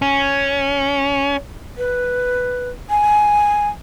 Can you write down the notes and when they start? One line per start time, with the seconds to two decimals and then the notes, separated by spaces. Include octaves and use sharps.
0.02 C#4
1.78 B4
2.90 G#5